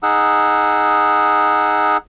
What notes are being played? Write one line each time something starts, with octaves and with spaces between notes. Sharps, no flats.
D#4 G#4 F#5 E6